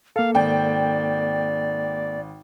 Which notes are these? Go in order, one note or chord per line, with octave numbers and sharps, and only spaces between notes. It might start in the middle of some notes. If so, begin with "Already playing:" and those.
A#3 A4 F5
G#1 D5 G5